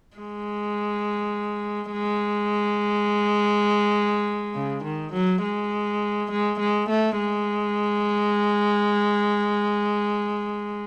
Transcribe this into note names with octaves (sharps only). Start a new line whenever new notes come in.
G#3
G#3
C#3
D#3
F#3
G#3
G#3
G#3
A3
G#3